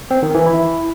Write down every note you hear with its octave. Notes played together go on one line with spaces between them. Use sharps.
C4
D#3
E3
E4